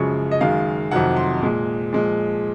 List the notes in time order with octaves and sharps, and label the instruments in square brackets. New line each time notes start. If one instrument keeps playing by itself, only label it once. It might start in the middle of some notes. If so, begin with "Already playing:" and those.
Already playing: [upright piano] F#2 C#3 F3 G#3 C#6
D#5
F#2 D#3 G#3 F5
F2 C3 D#3 F#3 F#5
C6
A#2 G#3
A#2 F3 G#3